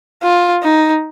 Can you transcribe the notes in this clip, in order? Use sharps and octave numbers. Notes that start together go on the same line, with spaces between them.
F4
D#4